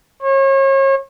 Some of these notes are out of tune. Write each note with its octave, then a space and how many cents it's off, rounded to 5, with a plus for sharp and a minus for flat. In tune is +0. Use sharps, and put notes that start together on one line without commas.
C#5 -35